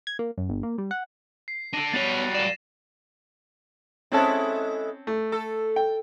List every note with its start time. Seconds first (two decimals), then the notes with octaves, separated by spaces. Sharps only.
0.07 G#6
0.19 A#3
0.38 F#2
0.49 G1
0.63 A#3
0.78 G3
0.91 F#5
1.48 C7
1.73 D4 A4 A#6 D#7
1.93 G3 B3 F#4 C#5 A6 F7
2.34 A#4 D5 E7
4.12 G#3 C4 C#4 E4 A4 A5
5.07 A3
5.32 A4
5.76 G5